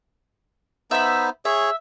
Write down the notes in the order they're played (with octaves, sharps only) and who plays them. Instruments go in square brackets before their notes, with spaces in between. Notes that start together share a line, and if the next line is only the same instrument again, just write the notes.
[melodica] B3 D#4 C5 [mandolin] E5 B5
[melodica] G#4 C#5 [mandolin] E5